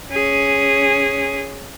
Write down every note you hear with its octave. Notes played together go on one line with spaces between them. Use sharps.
C#4 G#4